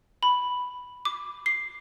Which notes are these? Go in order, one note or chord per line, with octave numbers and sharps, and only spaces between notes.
B5
D6
C7